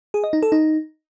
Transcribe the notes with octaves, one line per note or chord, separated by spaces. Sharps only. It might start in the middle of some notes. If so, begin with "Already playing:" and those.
G#4
D#5
D#4
A4
D#4